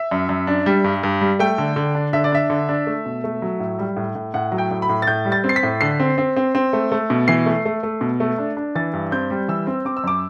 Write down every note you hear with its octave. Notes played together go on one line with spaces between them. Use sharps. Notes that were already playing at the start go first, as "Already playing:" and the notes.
Already playing: E5
F#2
F#2
D4
G3
G2
G2
G3
A3 G5
D3
D3
D4
D3 E5
D5
D4 E5
D3
D4
A3
B2
A3
F#3
A2
G3
A2
A2
A2 F#5
F#3
G5
A2
B5
A2
A6
A2 G6
G3
A6
C4
C7
B6
A2
D3 C7
C4
C4
C4
C4
A3
A3
B2
E3 C7
A3
A3
A3
B2
A3
D4
D4
E3 A6
G2
C4 G6
G3
E3 E6
C4
C4 D6
E6
F#2 D6